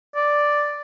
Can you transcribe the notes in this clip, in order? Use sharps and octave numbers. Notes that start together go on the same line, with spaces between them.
D5